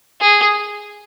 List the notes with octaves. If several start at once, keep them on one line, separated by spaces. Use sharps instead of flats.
G#4